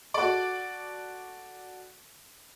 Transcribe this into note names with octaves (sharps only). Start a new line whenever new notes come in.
F#4 A4 D5